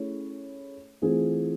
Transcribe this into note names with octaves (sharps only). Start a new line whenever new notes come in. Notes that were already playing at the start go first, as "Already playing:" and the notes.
Already playing: A3 C#4 E4 G#4 C#5
E3 A3 C4 F4 G#4